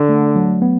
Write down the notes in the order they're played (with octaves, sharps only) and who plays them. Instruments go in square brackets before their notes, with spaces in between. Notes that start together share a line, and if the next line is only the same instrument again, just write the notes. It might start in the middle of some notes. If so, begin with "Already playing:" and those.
Already playing: [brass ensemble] D3
[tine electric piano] A3
F#3
B3